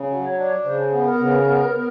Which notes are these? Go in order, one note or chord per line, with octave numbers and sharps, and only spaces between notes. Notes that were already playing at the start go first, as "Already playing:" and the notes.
Already playing: C#3
F#3
C#5
D4
C#3 C5
B3
A#4
C#3
B3
B3